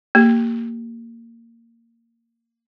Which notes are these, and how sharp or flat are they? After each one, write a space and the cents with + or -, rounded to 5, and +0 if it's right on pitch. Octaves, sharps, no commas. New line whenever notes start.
A#3 -15 G4 +0